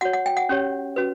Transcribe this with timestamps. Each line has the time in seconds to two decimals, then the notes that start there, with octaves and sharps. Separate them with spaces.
0.01 F#4 C#5 F#5
0.13 F#5
0.26 G5
0.37 F#5
0.49 C#4 G4 C#5
0.96 C#4 F#4 B4